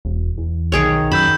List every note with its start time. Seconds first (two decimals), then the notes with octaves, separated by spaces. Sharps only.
0.05 E1
0.38 E2
0.72 B1 D#3 G#4 C#5
1.12 F#2 B5 E6 G6 E7